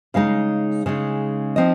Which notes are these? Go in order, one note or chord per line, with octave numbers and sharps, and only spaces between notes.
C#3 G#3 D#4 F5
C#3 G#3 D#4
F3 C4 D#4 D#5